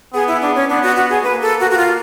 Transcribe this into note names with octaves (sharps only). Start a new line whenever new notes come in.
B3 G#4
E4
D4
C#4
B3 D4
F#4
F#4
G#4
A#3 B4
A4
F#4
F#4
F4